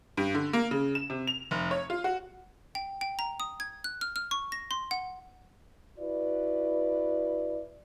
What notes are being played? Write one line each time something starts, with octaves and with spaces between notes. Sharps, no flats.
G2
D3
A#3
C#3
E7
C3
F7
F1
C#5
F4
F#4
G5
G5
A#5
D#6
G#6
F#6
F6
F6
C#6
A#6
C6
F#5
E4 F#4 B4 D5